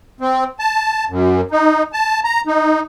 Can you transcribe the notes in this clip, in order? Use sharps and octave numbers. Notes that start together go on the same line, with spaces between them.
C4
A5
F#2
D#4
A5
A#5
D#4